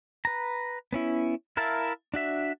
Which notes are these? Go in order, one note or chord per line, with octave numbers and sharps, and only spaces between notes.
B4 A#5
B3 C#4 E4
E4 A#4 E5 F5 A5
D4 F#4 E5